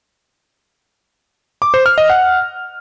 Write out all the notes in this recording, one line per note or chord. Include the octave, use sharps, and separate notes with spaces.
D6
C5
F6
D#5
F#5